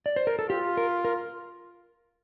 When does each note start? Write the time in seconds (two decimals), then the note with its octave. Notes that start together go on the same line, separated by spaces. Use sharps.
0.06 D5
0.16 C5
0.27 A#4
0.39 A4
0.49 F4 G4
0.77 A#4
1.05 A#4